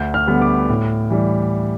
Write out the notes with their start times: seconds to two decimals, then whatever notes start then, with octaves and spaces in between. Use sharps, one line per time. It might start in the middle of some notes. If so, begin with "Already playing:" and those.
Already playing: D2 G6
0.14 F6
0.27 D3 G3 B3
0.42 D6
0.69 A2
1.10 E3 G3